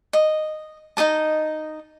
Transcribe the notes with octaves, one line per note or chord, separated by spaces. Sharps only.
D#5
D#4 G#4 D#5 A5